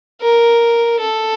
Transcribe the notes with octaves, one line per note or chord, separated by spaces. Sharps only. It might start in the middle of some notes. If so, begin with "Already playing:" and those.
A#4
A4